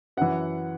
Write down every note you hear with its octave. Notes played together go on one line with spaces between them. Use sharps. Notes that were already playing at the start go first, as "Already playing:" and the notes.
F#2 E3 F#5